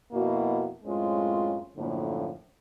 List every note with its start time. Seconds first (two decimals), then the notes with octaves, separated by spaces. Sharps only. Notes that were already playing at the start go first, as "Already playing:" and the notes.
0.12 F2 B2 A#3 E4 F#4
0.84 F#2 A2 G#3 C4 C#4 F4
1.77 F#2 A2 D3 F3 A#3